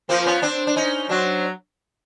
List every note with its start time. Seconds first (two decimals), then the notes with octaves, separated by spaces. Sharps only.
0.09 F3 A#3 C4
0.26 B3 C#4
0.42 C4 D4
0.67 D4
0.76 C#4 D#4
1.09 F#3 C4 D4